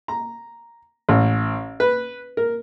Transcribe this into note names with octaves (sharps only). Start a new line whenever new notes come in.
A#5
A1
B4
A#4